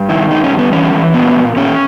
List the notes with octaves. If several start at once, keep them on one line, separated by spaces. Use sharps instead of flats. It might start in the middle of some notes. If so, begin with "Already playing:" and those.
Already playing: G2
D#3 E4
G2 D#4
C#4
G2
B3
E3 C#4
E3
A#2 B3
A#2
A#2 C#4